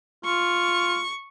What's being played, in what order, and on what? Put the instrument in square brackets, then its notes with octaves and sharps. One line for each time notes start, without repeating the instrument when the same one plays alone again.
[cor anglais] F4 [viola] C#6